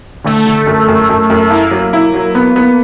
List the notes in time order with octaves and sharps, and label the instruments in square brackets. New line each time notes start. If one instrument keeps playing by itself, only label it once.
[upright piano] D3 [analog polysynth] A3
[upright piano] D3
F#2
F#2
F#2
F#2
[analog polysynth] A#3 [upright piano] E4
[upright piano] F#3
E4
F#3
B3
B3